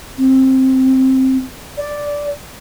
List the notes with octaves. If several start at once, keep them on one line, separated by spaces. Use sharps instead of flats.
C4
D5